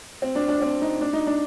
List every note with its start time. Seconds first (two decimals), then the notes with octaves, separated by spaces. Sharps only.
0.22 C4
0.35 D4
0.48 D4
0.61 C4
0.81 D#4
1.01 D4
1.13 D#4
1.27 D4